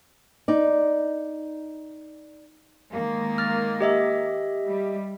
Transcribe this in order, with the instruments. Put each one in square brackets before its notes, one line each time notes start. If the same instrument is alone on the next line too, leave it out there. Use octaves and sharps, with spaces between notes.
[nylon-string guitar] D#4 D5
[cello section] D#3 G#3 A#3
[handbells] F6 A6
G4 D#5 E5
[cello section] G3